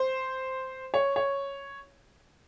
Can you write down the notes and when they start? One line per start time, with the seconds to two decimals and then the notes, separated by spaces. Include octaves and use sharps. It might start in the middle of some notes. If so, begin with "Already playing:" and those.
Already playing: C5
0.94 C#5
1.16 C#5